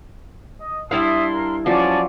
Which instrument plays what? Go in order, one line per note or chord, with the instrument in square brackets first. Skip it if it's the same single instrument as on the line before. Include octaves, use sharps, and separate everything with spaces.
[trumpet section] D#5
[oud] G3 E4 F5 [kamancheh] D4 C6 [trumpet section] E5 D#6
[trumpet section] A#4
[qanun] F3 F#3 [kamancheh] C#4 A5 [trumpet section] D5